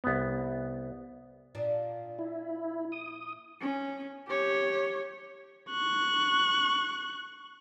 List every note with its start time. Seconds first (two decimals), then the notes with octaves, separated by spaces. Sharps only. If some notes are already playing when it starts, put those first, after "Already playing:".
0.04 C2 B3
1.55 A#2 F3 D4
2.19 E4
2.92 D#6
3.61 C#4
4.28 G4 C#5
5.70 C#6 F#6